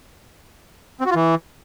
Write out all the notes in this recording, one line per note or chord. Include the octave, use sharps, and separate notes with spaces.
C4
F#4
F4
E3